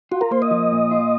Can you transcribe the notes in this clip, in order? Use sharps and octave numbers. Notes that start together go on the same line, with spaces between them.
F4 F#4
A#4
A#3 C5
D#5
F3
A#2
F4